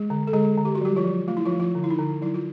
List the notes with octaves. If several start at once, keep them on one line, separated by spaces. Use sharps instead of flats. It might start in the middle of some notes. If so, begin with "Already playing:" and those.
Already playing: G#3 G#4
D3
A4
D3 G#3 G#4
D3
G4
F#4
F#3 G3 G4
F3 F4
F#3
A3 F4
E4
F3 F4
A3
F3 F4
D3
E4
D#4
D3
F#3 E4
F4